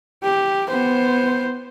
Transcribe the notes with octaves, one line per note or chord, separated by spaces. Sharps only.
G4
B3 C5